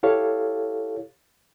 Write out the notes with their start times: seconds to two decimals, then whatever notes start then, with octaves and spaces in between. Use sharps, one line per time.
0.03 E4 G4 A4 C#5 F5